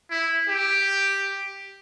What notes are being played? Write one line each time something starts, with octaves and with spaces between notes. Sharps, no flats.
E4
G4